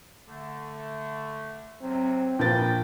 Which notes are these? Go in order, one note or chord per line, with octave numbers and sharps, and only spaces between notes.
D3 A3
E2 C3 F#3 C4
A#1 A#3 B4 G5 A6